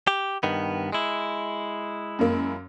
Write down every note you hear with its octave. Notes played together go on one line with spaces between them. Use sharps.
G4
G2 D#3 B3
G#3 E4
F#2 A#3